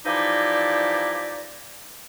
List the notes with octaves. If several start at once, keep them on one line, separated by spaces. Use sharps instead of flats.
E3 F3 D#4 E4 G4 D5